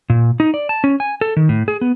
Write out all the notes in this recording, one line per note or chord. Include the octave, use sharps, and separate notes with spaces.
A#2
D#4
D5
A5
C#4
G#5
A4
D#3
A2
G#4
B3